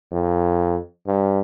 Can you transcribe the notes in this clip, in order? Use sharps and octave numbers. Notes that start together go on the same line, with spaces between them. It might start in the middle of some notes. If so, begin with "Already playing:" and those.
F2
G2